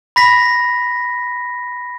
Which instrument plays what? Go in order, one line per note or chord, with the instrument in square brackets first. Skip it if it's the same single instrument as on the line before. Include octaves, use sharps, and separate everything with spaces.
[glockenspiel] B5 A#6 B6